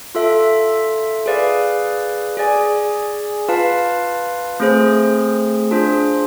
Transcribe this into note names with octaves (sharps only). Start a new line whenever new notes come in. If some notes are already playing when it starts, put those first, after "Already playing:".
F4 A4 E5
G#4 B4 D5 F5
G#4 D5 G#5
F4 B4 F5 A5
A3 C4 G#4 C5
D4 F4 G#4 C5